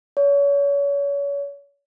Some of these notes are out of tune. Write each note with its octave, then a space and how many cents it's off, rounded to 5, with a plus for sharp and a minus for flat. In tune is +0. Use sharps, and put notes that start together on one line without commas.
C#5 +35